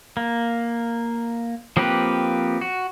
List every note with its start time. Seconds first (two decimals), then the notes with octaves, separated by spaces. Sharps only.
0.17 A#3
1.77 F3 A#3 C4 G4 B4
2.61 F#4